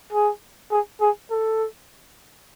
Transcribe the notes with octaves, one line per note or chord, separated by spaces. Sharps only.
G#4
G#4
G#4
A4